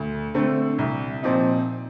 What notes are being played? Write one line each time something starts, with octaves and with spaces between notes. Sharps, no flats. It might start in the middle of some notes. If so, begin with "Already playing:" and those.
Already playing: D2
D3 A3 C4
C2
A#2 F3 C4 D#4